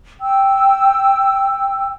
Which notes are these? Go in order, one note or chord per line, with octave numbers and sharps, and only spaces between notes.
G5 E6